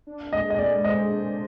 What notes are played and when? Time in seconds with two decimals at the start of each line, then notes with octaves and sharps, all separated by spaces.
0.07 D4
0.32 G#3 D#5
0.50 D#5
0.58 G#4 D5
0.84 C5 D#5
1.11 D4